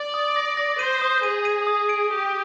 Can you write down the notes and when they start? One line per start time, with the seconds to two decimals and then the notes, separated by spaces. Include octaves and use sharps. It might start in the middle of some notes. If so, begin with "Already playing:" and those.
Already playing: D5
0.14 D#6
0.36 A#6
0.57 A#6
0.79 C5 D#7
1.02 D#6
1.23 G#4 D#7
1.45 D#7
1.67 D#6
1.89 D7
2.11 G4 D#6